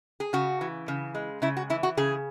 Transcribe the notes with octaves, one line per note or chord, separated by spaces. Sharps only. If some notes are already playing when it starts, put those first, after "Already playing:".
G#4
C#3 F#4
E3
C#3
G#3
C#3 E4
F#4
E3 E4
F#4
C#3 G#4